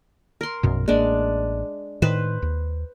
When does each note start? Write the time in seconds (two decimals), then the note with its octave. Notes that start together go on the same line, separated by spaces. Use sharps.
0.41 A#4 C6
0.63 A#1 F#2 B2
0.88 A1 G#3 A#3 D4
2.02 A2 D#3 B4 C5
2.42 D#2